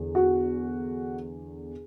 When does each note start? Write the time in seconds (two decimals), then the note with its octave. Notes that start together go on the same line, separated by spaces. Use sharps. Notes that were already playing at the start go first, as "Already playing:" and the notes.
Already playing: E2 D3
0.15 F#4